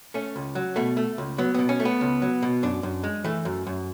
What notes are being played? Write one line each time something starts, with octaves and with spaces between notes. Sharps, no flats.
A3 C#4
C#2
F#3
B2 A3
A3
C#2
F#3 B3
B2 B3
C#4
A3
B3
C#2
F#3
B2
F#2 D4
F#2
G#3
E3 A3
F#2
F#2